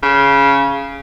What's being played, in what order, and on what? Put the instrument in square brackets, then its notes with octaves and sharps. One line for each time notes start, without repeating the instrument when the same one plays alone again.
[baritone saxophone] C#3